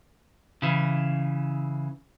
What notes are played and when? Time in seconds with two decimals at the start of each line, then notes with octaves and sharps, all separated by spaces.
0.62 C#3 E3